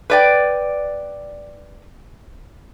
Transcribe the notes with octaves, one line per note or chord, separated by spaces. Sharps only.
B4 D5 G5